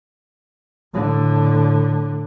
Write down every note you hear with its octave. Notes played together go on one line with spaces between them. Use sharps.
A2 D3